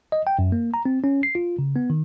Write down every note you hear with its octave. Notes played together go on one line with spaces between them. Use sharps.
D#5
G5
F#2
A#3
A#5
C4
C#4
C7
F4
C#3
B3
D#3